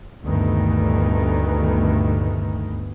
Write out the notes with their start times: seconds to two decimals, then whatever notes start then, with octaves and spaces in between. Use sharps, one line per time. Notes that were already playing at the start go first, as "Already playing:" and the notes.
0.23 D2 G2 A#2 D#3 A3 B3